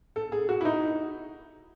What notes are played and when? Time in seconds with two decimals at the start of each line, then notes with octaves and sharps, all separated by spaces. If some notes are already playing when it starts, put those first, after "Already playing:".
0.16 A4
0.32 G#4
0.49 F#4
0.61 E4
0.65 D#4